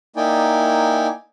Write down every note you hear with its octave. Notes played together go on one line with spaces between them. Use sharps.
A#3 D#4 E4 D5 G5 G#5